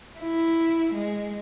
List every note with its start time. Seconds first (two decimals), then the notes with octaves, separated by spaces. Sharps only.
0.19 E4
0.94 G#3